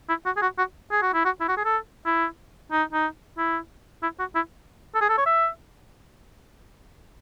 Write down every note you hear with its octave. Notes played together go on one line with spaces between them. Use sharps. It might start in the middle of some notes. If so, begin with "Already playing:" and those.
E4
F#4
G#4
F#4
F#4
G#4
F#4
E4
F#4
E4
F#4
G#4
A4
E4
D#4
D#4
E4
E4
F#4
E4
A4
G#4
A4
C#5
E5